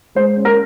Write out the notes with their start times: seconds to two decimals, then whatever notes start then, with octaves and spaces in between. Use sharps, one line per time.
0.15 G#3 C5
0.37 C#4
0.45 A#4